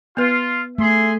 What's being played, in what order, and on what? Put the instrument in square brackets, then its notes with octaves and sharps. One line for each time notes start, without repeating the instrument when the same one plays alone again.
[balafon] B3 B4 [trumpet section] F4
[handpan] A3 [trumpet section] G#4 E5 C6